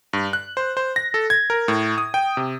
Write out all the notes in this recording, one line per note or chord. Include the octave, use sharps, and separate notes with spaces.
G2
F#6
C5
C5
A#6
A4
G#6
A#4
A2
D#6
G5
C3